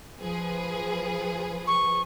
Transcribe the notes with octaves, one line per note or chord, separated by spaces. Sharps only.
F3 G#4 B4
C#6